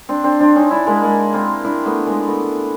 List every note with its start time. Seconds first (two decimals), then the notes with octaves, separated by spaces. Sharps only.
0.09 C4 D4
0.24 C4 D4
0.40 C4 D4
0.56 C#4 D#4
0.71 D4 E4
0.87 G#3 A#3
1.02 G#3 A#3
1.34 A#3 C4
1.64 D4 E4
1.85 A3 B3
2.06 G#3 A#3
2.27 A3 B3